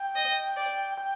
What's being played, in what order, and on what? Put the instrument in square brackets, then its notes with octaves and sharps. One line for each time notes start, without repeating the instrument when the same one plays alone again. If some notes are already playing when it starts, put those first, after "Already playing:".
Already playing: [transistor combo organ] G5
[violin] D#5
D5
[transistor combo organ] G5